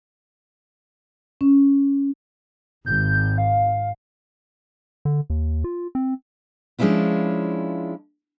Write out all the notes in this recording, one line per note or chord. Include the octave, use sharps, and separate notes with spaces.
C#4
G#1 G6
F5
D3
D#2
F4
C4
F3 G#3 C#4 D4 E4 F4